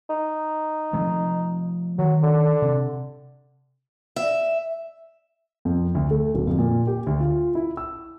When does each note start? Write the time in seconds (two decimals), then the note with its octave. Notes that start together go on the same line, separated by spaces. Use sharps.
0.10 D#4
0.93 F3 A3 C4
1.99 D#3 F#3
2.23 D3
2.62 C3
4.16 E5
5.65 F2
5.95 D2
6.10 A3
6.34 D1
6.47 F2
6.59 A#2
6.87 G4
7.07 D2
7.20 F4
7.55 E4
7.77 E6